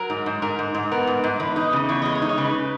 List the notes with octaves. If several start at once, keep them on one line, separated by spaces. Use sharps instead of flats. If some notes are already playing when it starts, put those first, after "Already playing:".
Already playing: F#3 A#4
G#2
G#2
G#2 A#4
G#2
G#2
B3 A#4
G#2
G#2
E2 B4
D#4
C#3
E2 C#5
G#3 D#5
C#5
D#4
C#5
C#3 B4
C#3